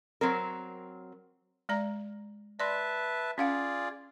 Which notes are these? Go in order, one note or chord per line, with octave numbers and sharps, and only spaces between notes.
F#3 C4 A#4
G#3 D5 A#5
B4 D5 E5 A5 C6
C#4 F4 G#4 D5 F5 F#5